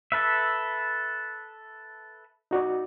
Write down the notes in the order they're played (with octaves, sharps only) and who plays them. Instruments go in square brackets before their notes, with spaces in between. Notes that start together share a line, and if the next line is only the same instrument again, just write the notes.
[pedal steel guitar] A4 B4 E5
[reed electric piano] D#4 F#4 D5